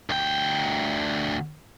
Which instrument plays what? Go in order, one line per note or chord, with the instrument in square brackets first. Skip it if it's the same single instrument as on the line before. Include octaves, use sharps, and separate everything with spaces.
[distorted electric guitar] D2 G5